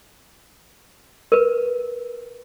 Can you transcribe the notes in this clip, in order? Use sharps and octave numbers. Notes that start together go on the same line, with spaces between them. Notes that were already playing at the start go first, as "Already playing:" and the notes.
A#4 B4